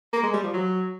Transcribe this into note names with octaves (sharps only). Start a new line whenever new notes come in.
A#3
G#3
G3
F3
F#3